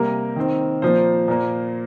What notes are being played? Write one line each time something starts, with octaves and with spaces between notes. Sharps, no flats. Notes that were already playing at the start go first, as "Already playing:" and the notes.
Already playing: C3 G3 A#3 A#4
D#3 C4
A#2 F3 A#3 C5
A#2 A#3